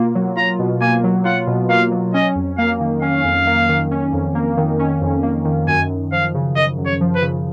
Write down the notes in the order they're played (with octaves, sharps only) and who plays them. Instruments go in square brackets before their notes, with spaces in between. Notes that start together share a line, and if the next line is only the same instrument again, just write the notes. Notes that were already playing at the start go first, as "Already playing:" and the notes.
Already playing: [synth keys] B2 A#3 F4
F#3
[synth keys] F4 [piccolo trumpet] A#5
[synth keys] B2
[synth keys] A#3 [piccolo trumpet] G#5
[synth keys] F#3
[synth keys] F4 [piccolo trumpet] F#5
[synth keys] B2
[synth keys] A#3 [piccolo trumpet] F5
[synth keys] F#3
[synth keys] C#4 [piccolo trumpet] D#5
[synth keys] F2
[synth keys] A#3 [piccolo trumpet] F5
[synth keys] D#3
[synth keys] C#4 [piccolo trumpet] F5
[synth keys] F2
A#3
D#3
C#4
F2
A#3
D#3
C#4
F2
A#3
D#3
[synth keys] F#2 [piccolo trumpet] G#5
[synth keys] F#2
[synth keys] F3 [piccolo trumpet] F5
[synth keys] C#3
[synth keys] F#2 [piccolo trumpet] D#5
[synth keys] F#2
[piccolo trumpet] C#5
[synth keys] F3
[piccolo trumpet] B4
[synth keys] C#3